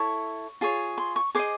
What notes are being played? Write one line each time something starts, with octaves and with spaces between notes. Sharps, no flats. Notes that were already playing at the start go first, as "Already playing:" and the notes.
Already playing: E4 A4 C#5 C#6
F4 G#4 C#5
C6
C#6
G#4 C5 D#5 D6